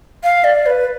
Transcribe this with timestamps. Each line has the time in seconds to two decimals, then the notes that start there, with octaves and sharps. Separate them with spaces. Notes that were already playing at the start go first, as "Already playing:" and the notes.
0.24 F5
0.44 D5
0.66 B4